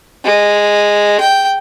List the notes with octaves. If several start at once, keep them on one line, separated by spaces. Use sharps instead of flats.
G#3
G5